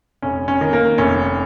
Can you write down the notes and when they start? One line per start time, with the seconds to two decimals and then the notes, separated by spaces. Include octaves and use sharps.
0.22 F1 C#4
0.48 C#4
0.61 D#3
0.73 A#3
0.98 F1 C#4